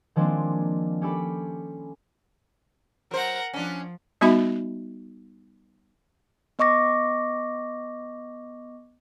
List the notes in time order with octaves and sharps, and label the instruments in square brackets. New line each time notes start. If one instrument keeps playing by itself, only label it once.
[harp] D#3 F3 G#3 A#3 C4 D4
C#4 G4 A4 B5
[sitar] F#3 C5 [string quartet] A#4 F#5 A#5
[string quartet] F3 [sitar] C#4 D4
[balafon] G3 B3 D#4 F#4 E5 B5
[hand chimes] B3 D#5 C#6 D6 A#6